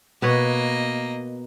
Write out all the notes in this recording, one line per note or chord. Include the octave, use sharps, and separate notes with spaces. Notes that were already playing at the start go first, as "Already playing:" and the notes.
B2 A#3 B4 C#5 D#5